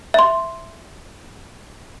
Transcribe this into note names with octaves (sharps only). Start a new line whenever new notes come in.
E5 C6